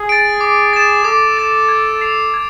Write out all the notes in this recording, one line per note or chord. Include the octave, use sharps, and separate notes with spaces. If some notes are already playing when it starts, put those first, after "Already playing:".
Already playing: G#4
A6 D7
D6
A6 E7
A4 D6
A6 E7
G#6
C7 F7
G#6